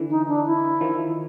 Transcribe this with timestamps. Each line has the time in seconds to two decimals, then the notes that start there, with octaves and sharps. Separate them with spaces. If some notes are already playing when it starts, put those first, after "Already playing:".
Already playing: D3 E3
0.10 D#4
0.28 D4
0.46 E4
0.81 D#3 F3